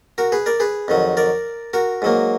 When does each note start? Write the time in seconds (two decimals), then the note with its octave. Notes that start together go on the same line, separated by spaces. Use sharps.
0.18 F#4 A#4
0.32 G#4 B4
0.46 A#4 D5
0.60 G#4 B4
0.88 F2 D#3 F#3
1.17 A#4 D5
1.73 F#4 A#4
2.02 G#2 F#3 A#3